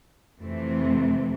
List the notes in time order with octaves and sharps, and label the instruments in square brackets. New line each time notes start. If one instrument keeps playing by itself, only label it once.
[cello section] F2 C3 E3 A3 C4